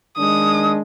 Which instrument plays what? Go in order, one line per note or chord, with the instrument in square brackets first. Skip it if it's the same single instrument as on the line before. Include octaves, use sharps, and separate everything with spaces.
[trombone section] D#3 G#3 D4 [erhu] D#6